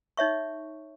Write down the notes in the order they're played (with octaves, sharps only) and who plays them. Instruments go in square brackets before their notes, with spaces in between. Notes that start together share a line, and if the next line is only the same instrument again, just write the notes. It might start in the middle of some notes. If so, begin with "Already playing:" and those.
[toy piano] D#4 C#5 E5 C#6